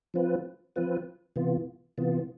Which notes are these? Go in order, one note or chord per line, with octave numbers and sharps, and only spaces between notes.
F3 C4 F4 B4
F3 C4 F4 B4
C3 E3 B3 F4
C3 E3 B3 F4